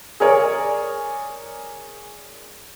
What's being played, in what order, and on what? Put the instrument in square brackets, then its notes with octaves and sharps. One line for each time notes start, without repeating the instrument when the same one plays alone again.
[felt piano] G#4 A#4 C#5 D5